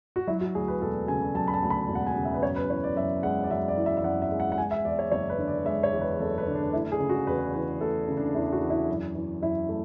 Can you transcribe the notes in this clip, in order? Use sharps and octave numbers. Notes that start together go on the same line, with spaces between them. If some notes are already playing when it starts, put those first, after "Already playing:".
F#4
F#3 E4
F#4
D2 G#4
B4
E1 A4
C#3 G#5
F#3 A5
B5
A5
D2
B5
E1
F#5
G#5
C#3
E5
B4
F#2 C#5
B4
E3 C#5
D5
F#2 E5
G#3 F#5
D5
F#2 E5
D5
E3
E5
E5
F#2 F#5
E5
G#3
F#5
F#5
G#3 G#5
E5
E2 D5
C#5
F#1 C#5
B4
D3
D5
G#3 E5
C#5
E2
B4
F#1 A4
B4
D3
D4
A3 E4
G#4
C#3
F#4
E2 B4
E3 B4
A3 A4
C#3
D4
E2 E4
F#4
E3
E4
F#2
E3
F#2 E4
A3